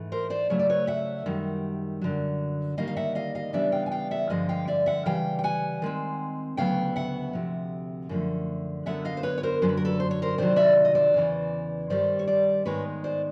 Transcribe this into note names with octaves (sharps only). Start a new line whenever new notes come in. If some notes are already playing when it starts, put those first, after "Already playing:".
Already playing: G#2 E3 A3
A#4 C5
C5 D5
C#3 F#3 A3 C#5
D5
B4 C#5
E5 F#5
F#2 D#3 G3
F#2 D3 F#3
D#3 G3 A#3 D#4 D#5 F5
F5
E5 F#5
D#5 F5
D#5 F5
C#3 E3 G3 B3 D4 D5 E5
F5 G5
G#5
F5 G5
E5 F#5
G2 D3 F3 G#3 D#5 F5
F5 G5
D5 E5
E5 F#5
C#3 E3 G3 F5 G5
G5
F#5 G#5
D#3 G#3 C4
D2 C#3 F#3 B3 F5 G5
E5 F#5
D2 C3 F3
F#2 D3 F3 A3
F#2 D3 F#3 B3 E5 F#5
D#5 F5
C5
B4 C#5
C#5
A#4 C5
F#2 D3 F#3 C5
B4
A#4
A4 B4
C5
C#5
A#4 C5
C3 D#3 F#3 C5 D5
D5 E5
D#5
C5 D5
E2 C#3 E3
G2 D#3 G3 C5 D5
C#5
C5 D5
G#2 D#3 G#3 B3 D#4 B4 C#5
C5 D5